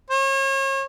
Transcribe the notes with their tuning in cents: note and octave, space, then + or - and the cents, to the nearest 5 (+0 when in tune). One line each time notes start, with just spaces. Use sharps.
C#5 -40